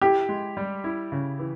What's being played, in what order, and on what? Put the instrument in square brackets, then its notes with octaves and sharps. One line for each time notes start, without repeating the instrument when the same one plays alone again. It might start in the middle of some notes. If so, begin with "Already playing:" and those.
[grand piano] E4 [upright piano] G4
[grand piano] G#3
G3
E4
C#3
E3